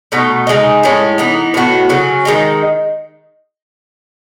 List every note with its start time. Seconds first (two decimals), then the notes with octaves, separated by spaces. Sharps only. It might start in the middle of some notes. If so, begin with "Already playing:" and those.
0.12 B2 A3 D#4
0.47 C#3 G#3 D#4
0.83 A2 G#3 C#4
1.18 E3 B3 D#4
1.54 A2 F#3 B3 F#4
1.89 C#3 F#3 C#4
2.25 D#3 G#3 D#4